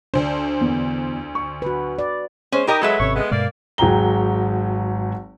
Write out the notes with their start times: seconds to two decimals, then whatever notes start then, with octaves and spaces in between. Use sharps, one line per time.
0.14 D2 D4 C5
0.61 E2
1.35 C#6
1.62 F#4 B4
1.99 D5
2.52 G#3 C#4 C5
2.67 D#4 G4 A#4 D#5
2.81 F#3 G#3 A4 B4 E5
3.00 G#1 C3 C#4 C#5
3.15 G#3 B3
3.31 G2 B2 G#3 A#3 D5
3.78 G#1 F#3 G#4 G5 A#5 G7